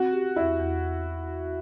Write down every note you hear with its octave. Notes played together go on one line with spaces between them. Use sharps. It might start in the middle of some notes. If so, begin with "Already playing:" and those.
Already playing: C4 F#4
G4
E2 E4
E2